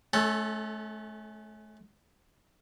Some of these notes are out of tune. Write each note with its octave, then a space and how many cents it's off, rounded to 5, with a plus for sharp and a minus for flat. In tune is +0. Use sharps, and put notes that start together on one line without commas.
A3 -35 C#4 -5 A4 +0